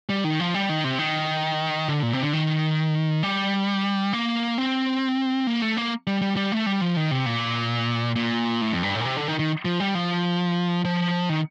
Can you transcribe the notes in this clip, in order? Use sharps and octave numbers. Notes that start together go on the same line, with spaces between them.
G3
D#3
F3
G3
D#3
C3
D#3
D3
A#2
C3
D3
D#3
G3
A#3
C4
A#3
A3
A#3
G3
G3
G3
A3
G3
F3
D#3
C3
A#2
A#2
A2
F2
G2
A2
A#2
C3
D3
D#3
D#3
F3
G3
F3
F3
D#3